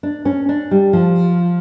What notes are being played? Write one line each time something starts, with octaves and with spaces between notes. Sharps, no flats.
D4
C#4
D4
G3
F3